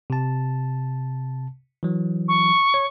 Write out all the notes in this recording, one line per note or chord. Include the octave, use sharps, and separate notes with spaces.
C3 A5
E3 F#3
C#6
C#5